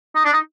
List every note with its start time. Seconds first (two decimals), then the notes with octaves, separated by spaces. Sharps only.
0.15 D#4
0.25 D4
0.33 D#4